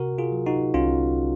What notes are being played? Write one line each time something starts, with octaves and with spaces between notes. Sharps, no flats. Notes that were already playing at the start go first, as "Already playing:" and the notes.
Already playing: C3 F#4 A#4
F4 G#4
F#3
D#4 F#4
C2 C#4 F4